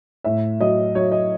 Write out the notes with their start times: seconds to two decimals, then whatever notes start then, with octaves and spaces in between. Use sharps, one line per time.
0.24 A2 E5
0.60 F#3 D#5
0.95 F#3 C#5
1.12 D#5